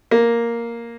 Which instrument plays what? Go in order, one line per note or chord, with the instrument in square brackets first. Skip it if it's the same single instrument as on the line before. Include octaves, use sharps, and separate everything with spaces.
[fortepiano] A#3